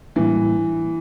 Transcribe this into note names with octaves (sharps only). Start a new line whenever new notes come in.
A2 E3 G3 A#3 D4